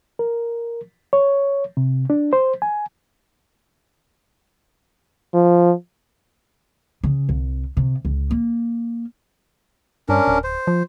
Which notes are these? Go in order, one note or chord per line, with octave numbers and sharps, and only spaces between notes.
A#4
C#5
C3
D4
C5
G#5
F3
C#3
C2
C3
C#2
A#3
G2 C#4 D4 A#4
D1
C5
F3